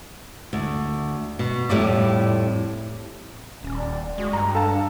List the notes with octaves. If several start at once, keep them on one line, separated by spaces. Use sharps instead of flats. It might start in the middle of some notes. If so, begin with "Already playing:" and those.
D2
B2
F2 A2 G3 D5
D#1 C#4
D5
G#3 F#4
G2 G#3 A#5
D4 A4 F5 A5
D4